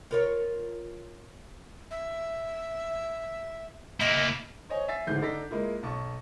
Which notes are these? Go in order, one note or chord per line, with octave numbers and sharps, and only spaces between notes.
F4 A#4 C#5
E5
A#3 E4 D#5
C5 C#5 D#5 G#5
E5 G#5 A6 C7
D1 D2 G#2 E3 G6 C7
D3 D#4 A4 D5 A#6 B6
G#3 A#3 E4 F4
B1 A5 C#6